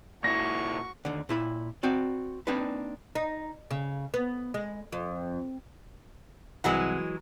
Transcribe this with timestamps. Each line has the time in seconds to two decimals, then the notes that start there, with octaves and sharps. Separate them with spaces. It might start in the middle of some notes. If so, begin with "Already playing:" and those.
0.24 A#2 E4 F#4 C#6 A#6
1.05 D#2 D3
1.29 A#2 E4 B5
1.83 C4 F#4 D5
2.47 A#3 C4 D4 D#4 B4
3.15 D#4
3.71 C#3
4.14 B3
4.54 G#3
4.92 F2
6.64 C2 E3 F#3 G#3 F#5